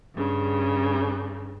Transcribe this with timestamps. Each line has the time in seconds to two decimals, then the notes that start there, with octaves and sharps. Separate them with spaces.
0.15 G2 C#3